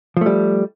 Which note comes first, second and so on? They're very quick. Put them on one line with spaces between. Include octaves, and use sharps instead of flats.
F3 A3 G3